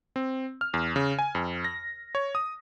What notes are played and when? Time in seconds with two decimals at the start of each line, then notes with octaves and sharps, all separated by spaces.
0.16 C4
0.61 F6
0.74 E2
0.96 C#3
1.19 G#5
1.35 F2
1.64 A#6
2.15 C#5
2.35 D#6